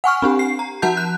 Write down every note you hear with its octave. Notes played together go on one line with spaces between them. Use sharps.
F#5 G#5 C#6 F6
C4 D4 G4
C7
A#5
F3 F#4 F#5 A5 G6
F#6